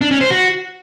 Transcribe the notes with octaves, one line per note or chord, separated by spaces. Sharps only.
D4
C#4
C5
F#4